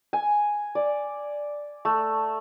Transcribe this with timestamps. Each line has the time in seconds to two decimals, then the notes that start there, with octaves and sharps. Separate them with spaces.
0.13 G#5
0.75 D5
1.85 A3